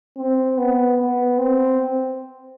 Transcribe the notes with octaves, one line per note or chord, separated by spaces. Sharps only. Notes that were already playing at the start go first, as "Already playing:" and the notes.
C4
B3
B3
C4